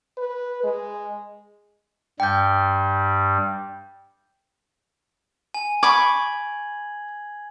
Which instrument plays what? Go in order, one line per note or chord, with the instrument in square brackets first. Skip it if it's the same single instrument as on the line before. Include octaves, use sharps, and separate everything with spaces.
[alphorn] B4
G#3
[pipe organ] G2 G3 [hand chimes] G5 G6
[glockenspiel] G#5
[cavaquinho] B5 C#6 D6 [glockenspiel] G#6 F#7